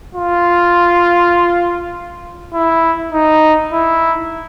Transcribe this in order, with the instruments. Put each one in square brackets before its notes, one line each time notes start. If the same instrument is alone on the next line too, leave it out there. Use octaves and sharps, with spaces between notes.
[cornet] F4
E4
D#4
E4